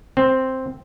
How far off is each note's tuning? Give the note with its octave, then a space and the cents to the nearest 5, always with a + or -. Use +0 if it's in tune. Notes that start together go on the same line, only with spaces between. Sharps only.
C4 +0